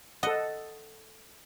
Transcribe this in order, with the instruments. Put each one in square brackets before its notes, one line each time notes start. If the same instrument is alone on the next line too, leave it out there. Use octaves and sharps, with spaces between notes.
[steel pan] A4 F#5 [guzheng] D#5